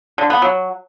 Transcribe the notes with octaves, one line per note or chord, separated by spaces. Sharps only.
D3
B3
F#3